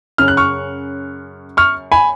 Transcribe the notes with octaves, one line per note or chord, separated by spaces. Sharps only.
F#2 C#3 F6
F#6
C#6 F6
C#6 F6
G#5 B5